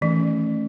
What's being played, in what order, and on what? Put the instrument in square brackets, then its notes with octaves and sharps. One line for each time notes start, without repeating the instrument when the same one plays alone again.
[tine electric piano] D#3 A3 C#4 [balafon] E3